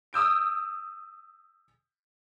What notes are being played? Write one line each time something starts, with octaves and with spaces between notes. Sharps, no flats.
D#6 E6 G6 D7